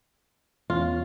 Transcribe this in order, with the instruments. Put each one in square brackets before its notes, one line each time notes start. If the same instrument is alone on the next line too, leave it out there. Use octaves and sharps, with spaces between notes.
[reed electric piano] E2 C#4 [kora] F4